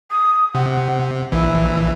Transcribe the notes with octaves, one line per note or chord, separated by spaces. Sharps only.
D#6
C3 F#5
A#1 E3 E4